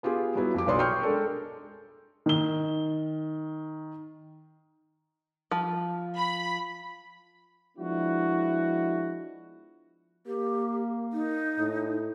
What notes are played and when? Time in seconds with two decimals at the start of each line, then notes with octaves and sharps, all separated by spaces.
0.03 B3 F4 G4 G#4
0.35 F#3 G3 B3 E4
0.55 F2 G4 D6
0.67 B1 B4 C#5 D5 C6 D#6
0.79 G5 C6 C#6 F6 G6 C#7
1.02 G#3 D4 A4 A#4
2.26 D#3 G7
5.51 F3
6.17 B5
7.77 F3 G#3 B3 D4 E4 F#4
10.27 A#3 G4
11.13 D#4
11.58 A2